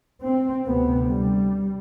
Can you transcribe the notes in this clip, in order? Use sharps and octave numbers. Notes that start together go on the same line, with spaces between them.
C4
D2 C3 B3
G3